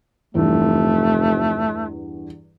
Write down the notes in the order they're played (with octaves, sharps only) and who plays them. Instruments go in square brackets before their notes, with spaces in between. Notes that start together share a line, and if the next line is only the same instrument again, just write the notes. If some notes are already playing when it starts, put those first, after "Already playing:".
[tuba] F1 [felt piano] E2 G2 [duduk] A3